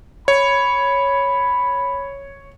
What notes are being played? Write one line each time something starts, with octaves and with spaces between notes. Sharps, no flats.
C#5 B5